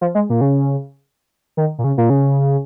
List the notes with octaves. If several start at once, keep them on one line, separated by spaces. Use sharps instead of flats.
F3
G#3
A#2
C#3
D#3
A#2
C#3
A#2
C#3